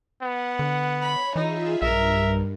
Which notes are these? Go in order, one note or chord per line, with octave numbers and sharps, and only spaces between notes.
B3 F#5
D3
C#5 B5
E3 D#4 F4 G#4 E5
B1 G2 A#4 E5